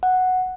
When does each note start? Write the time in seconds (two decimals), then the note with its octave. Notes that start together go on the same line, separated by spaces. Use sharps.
0.03 F#5